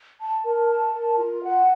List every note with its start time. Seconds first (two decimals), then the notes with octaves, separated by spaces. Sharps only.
0.20 A5
0.44 A#4
0.69 A5
0.93 A#4
1.18 F4
1.42 F#5